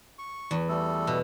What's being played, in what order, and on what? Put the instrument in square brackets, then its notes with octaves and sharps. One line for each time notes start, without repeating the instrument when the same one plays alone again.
[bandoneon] C#6
[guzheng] E2
[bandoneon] G3 A3 A4
[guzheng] B2